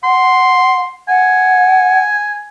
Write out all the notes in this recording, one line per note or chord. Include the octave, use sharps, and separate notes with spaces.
F#5 C6
F#5 G#5